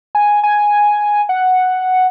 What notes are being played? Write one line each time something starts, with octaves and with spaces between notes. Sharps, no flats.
G#5
G#5
F#5